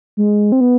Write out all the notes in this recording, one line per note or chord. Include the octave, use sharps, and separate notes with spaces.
G#3
C4
B3